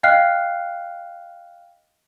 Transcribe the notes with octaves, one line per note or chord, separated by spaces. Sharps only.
D#5 F5 G5 F6 F#6 C7